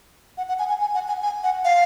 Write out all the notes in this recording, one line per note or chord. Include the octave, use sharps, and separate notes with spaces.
F#5
F#5
G#5
G#5
G#5
F#5
G#5
G#5
F#5
F5